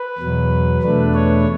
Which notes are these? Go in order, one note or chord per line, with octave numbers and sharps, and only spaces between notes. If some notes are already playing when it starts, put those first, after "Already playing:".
Already playing: B4
E2 B2 F#3
E2 B2 A3 D4 B4
C#5